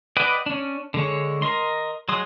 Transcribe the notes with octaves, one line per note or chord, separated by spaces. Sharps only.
B4 D5 D#5 F#5 G5
C#4 D4
D3 G#3 C#5
A#4 D#5 C6
F#3 G#3 C6 D#6